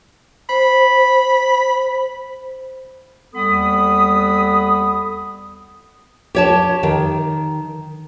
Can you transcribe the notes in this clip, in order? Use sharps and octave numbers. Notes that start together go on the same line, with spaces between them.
C5 B5
D#2 G3 B3 A4 B5 D#6
G4 C#5 A5
D#3